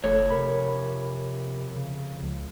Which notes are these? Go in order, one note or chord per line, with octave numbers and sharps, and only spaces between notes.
F#1 F2 A3 A4 C#5
C3 A#4 B5
C#3
C#2